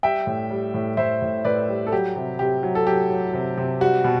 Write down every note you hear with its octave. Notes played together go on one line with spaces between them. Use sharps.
G3 E5 G5
A2
G3
A2
A2 C5 E5
A2
A2 B4 D5
G3
A4
F#3 G4
C3
C3 G4
F#3
A4
F#3 G4
F#3
C3
C3
G3 F#4
B2